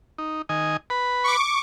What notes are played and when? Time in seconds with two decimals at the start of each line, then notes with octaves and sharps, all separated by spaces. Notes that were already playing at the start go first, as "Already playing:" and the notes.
0.18 D#4
0.49 D#3 D#5 G#5
0.90 B4 B5
1.24 C#6 D6